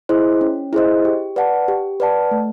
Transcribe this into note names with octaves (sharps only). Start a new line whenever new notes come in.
E4 G#4 C5 D#5
C#4
E4 G#4 C5 D#5
G4
B4 D5 F#5 A5
G4
B4 D5 F#5 A5
A3